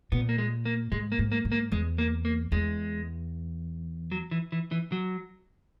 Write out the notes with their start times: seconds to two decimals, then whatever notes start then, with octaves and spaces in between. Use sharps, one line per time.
0.12 A#2 B3
0.29 A#3
0.38 G#3
0.65 A#3
0.92 G#2 G#3
1.12 A#3
1.19 G#2
1.32 A#3
1.45 G#2
1.52 A#3
1.72 E2 G#3
1.98 A#3
2.25 A#3
2.52 E2 G#3
4.12 F#3
4.31 E3
4.52 E3
4.71 E3
4.92 F#3